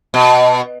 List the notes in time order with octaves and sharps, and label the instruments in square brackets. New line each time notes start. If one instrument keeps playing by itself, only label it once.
[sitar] B2